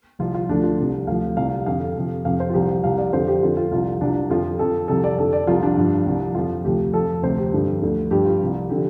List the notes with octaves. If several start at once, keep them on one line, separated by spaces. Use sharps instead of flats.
C2 C3 F3 F4
F4
D2 D3 F3 D4
F4
C2 C3 F3
D2 D3 F3 F5
C2 C3 F3 F5
F2 D3 F3 F5
F2 C3 F3
F2 C3 F3 F5
C5
F4
C2 C3 F3 G4
C2 C3 F3 F5
D5
F2 D3 F3 C5
G4
F2 D3 F3 F4
F4
C2 C3 F3 F4
C2 C3 F3 D4
F2 D3 F3 F4
F2 F3 A4
C2 C3 F3 A4
D5
F2 D3 F3 A4
D5
C2 C3 F3 F4
D4
G2 F3
C2 C3 F3
F2 F3 F4
D2 C3 F3 G4
F2 F3 A4
D2 C3 F3 C5
G4
G2 D3 F3
D2 D3 F3
G2 F3 G4
F4
C2 C3 F3
D3 F3 G4